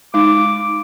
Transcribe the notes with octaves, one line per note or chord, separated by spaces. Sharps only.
G#3 D#4 D6